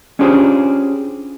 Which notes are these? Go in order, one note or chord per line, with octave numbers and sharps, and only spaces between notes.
C#4 D4 F4 G4 G#4 C5